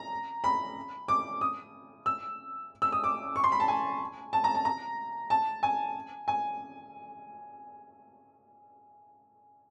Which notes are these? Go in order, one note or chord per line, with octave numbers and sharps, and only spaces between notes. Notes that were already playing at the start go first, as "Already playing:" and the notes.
Already playing: A#5
B5
D6
D#6
E6
E6
D#6
D6
C#6
C6
B5
A5
G#5
A5
A#5
A5
A#5
A5
G#5
G#5